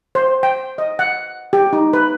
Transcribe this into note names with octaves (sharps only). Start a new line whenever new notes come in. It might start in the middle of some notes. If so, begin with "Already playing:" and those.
C5
G5
D#5
F#5
G4
D#4
B4